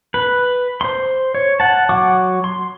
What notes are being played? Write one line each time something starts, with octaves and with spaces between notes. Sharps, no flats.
B4
C5 C6
C#5
F#5 A5
F#3 F#5 C#6 D6
C6